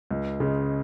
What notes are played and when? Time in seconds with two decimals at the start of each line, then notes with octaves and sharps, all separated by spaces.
0.11 C#2
0.40 C#3 G#3